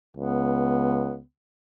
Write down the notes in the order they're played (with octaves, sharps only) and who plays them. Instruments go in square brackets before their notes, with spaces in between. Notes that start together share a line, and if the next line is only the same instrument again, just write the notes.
[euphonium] C#2 [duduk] B3